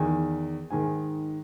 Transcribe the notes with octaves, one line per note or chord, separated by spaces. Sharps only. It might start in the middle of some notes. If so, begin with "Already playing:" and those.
Already playing: E2 D#3 G#5
G#2 D#3 G#5